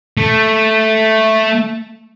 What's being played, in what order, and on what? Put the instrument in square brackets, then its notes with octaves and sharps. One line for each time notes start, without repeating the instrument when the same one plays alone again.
[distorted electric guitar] A3